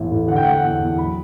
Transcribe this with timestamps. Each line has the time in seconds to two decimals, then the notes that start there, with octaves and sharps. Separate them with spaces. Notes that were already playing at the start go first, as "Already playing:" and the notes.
Already playing: A1 E2 A2 A3
0.11 A2
0.28 D3 F#5
0.36 G5
0.45 A3 F#5
0.63 E2
0.80 E2
0.98 F#3 B5